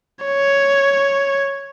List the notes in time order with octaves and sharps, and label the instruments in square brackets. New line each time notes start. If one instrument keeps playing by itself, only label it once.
[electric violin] C#5